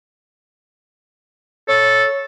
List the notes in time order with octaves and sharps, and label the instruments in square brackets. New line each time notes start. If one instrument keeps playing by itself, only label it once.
[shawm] A4 [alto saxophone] C#5